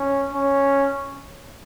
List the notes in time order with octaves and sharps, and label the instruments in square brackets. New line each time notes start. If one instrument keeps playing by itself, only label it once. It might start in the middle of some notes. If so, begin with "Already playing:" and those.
Already playing: [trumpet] C#4
C#4